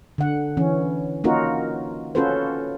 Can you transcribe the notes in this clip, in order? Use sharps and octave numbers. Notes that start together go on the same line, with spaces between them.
D3 F#5
E3 C#4
A#3 C#4 D#4 F4 F#4 A#4
C#4 F4 F#4 A4 B4 C5